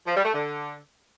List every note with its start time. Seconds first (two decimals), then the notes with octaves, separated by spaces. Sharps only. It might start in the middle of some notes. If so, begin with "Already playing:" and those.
0.07 F3
0.16 G3
0.25 A3
0.34 D3